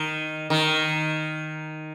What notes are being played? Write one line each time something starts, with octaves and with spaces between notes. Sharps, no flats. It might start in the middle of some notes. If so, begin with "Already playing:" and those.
Already playing: D#3
D#3